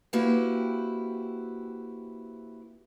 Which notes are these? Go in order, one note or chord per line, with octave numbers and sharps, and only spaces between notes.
A#3 C4 E4 F#4 G4 B4